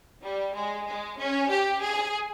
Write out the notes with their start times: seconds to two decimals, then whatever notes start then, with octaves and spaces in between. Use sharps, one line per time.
0.22 G3
0.54 G#3
0.86 G#3
1.18 C#4
1.49 G4
1.81 G#4